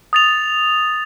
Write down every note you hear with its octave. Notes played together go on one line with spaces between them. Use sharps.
D#6 A6 F7